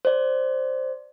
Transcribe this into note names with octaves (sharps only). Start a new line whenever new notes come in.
C5 D5